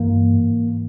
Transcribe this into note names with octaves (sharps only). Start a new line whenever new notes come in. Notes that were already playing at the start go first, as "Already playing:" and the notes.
Already playing: G2 E3 A#3
G#2 E3